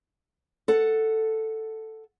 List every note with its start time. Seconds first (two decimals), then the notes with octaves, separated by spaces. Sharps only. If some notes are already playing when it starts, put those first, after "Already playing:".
0.68 A4 F#5